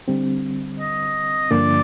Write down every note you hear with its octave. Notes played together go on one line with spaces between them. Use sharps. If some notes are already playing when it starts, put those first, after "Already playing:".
D3 G3 C4
D#5
G2 D3 F3 A#3 D4 D5